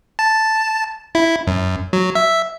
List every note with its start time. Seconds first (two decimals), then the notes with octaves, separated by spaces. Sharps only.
0.19 A5
1.15 E4
1.47 F#2
1.93 F#3
2.15 E5